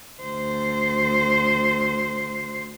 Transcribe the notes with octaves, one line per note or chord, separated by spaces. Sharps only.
D2 C5